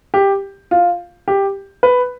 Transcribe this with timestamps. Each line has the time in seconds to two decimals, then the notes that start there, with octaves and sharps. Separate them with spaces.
0.14 G4
0.71 F4
1.28 G4
1.83 B4